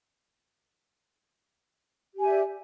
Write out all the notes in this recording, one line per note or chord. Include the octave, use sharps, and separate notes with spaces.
G4 D5 E5 G#5